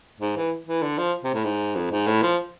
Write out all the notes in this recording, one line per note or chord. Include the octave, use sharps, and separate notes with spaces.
G#2
E3
E3
D3
F3
C3
A2
G#2
F2
G#2
A2
F3